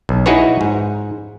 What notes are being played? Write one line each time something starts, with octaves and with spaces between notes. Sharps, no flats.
B1
D#4 E4 F#4 G#4 B4 C#5
G#2